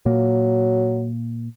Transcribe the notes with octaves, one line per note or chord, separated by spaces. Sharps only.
A#2 F#3 A#3